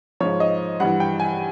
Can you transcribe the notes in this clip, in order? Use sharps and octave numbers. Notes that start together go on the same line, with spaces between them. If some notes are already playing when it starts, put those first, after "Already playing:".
G#2 F3 C#5
D#5
G2 E3 F#5
G5
G#5